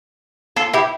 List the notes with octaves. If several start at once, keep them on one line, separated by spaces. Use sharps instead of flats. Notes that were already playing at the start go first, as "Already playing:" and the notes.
F4 A4
E4 G4